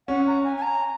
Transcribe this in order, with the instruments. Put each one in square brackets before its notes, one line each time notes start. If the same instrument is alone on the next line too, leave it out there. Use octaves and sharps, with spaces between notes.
[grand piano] C#4 [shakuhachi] F#5
[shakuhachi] A#5
G#5
G#5
A#5